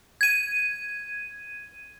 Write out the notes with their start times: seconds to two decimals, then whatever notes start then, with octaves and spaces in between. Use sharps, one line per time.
0.21 G#6 D#7